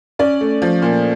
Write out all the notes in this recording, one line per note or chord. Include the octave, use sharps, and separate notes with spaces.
C#4 D5
A3
F3
A#2